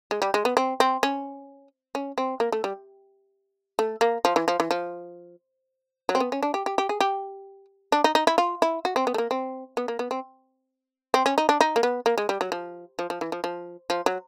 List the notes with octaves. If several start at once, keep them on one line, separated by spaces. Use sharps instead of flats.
G#3
G3
G#3
B3
C4
C4
C#4
C#4
C4
A#3
A3
G3
A3
A#3
F3
E3
F3
E3
F3
F#3
C4
B3
C#4
D4
G4
G4
G4
G#4
G4
D4
D#4
D#4
E4
F4
E4
F#4
C4
B3
A3
A#3
C4
B3
A#3
B3
C4
C4
C#4
D#4
D4
D#4
A#3
B3
A#3
G#3
G3
F#3
F3
F3
F3
E3
F3
F3
F3
F#3